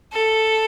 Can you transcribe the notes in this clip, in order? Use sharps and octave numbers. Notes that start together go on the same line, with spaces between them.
A4